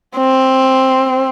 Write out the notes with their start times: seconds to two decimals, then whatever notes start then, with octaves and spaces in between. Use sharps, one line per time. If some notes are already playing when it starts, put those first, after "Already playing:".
0.17 C4